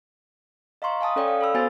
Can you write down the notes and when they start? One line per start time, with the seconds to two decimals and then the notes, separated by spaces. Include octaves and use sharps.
0.82 D#5 F5 A#5 C6 C#6
1.01 F5 G#5 A5 D#6
1.16 C#4 A4 C#5 D5 G5
1.28 F5
1.41 A4 B5 E6
1.54 B3 F#4 C5 G#5 A6